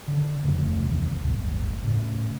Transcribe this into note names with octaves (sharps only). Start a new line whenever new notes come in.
D3
D#1 F2 C#3 A3
A#1 D#2 C3 E3
D1 G1 D2 A2
A2 C#3